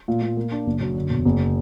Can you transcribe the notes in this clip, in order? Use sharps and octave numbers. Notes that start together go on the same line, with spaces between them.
A#2
A#2
A#3
D4
F#1
F#2
D3
E1
F#1